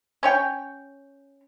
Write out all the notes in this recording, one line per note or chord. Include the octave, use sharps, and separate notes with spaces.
C#4 C#5 G5